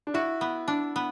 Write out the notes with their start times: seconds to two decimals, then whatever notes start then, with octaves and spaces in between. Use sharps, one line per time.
0.07 D4
0.14 E4 F#4
0.41 B3
0.68 D4
0.96 B3